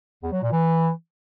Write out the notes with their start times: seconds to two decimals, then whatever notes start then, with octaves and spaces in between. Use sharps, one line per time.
0.22 E2
0.32 F#3
0.42 A#2
0.51 E3